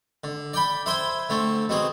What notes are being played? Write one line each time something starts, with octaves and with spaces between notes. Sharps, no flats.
D3
D5 G5 B5
E4 C5 G5 G#5
D3 A3 C4
B2 C4 G#4